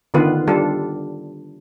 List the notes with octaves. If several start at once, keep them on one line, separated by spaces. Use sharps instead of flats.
D3 D#3 B3 F4 B4
G3 D4 F4 A4